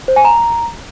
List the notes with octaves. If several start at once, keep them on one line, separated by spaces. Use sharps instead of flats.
C5
G#5
A#5